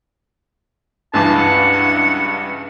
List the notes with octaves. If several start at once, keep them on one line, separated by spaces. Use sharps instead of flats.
C#2 G2 E3 A5
F#5